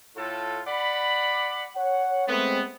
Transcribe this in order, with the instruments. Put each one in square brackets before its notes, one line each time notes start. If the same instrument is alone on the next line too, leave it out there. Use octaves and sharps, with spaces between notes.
[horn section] A2 F4 A4
D5 F#5 B5
[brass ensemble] C#5 F#5
[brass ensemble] G#3 A3 C4 [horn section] B3